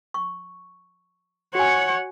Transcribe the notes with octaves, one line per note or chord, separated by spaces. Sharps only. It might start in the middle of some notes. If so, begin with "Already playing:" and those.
C#6
F#4 C#5 F#5 G#5